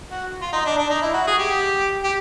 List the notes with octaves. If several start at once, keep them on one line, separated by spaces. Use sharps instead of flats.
F#4
F4
D#4
D4
D4
D#4
E4
F#4
G#4
G4
G4